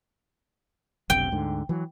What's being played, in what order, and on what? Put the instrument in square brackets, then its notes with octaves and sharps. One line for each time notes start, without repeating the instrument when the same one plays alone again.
[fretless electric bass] F1 B1 C3 [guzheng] G5
[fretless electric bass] D2 G#2 D3
E3 F#3